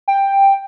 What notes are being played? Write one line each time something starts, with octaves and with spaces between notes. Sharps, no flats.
G5